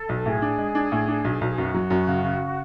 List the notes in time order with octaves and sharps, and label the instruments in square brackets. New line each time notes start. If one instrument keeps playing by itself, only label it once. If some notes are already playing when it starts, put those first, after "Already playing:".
Already playing: [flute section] A4
[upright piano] B1
[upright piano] A2 [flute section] G#4
[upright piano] D4
G#3
D4
A2
D4
B1
[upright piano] B1 [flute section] A4
[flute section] G#4
[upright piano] F#2 [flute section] F#4
[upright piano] F#3
F#2
C#3
C#3